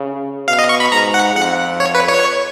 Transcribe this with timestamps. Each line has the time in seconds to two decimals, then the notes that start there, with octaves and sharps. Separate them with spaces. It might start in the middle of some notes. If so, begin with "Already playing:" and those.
Already playing: C#3
0.48 B2 F5
0.59 D#5
0.69 C#6
0.80 B5
0.92 G#2 A#5
1.14 F#5
1.35 F2 F#5
1.80 C#5
1.95 B4
2.09 C#5